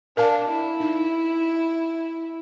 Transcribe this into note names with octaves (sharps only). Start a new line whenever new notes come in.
D4 A#4 F5 A5
E4
D#4